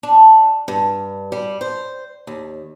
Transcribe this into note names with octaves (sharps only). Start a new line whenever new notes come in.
D4
G2
G3
C5
D#2